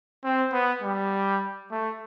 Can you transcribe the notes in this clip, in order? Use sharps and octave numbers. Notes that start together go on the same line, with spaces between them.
C4
B3
G3
A3